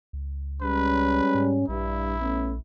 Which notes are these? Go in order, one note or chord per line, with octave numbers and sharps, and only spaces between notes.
C#2
G3 G#3 C#4 B4
G#2
A#1 G2 E4
A3 B3 C#4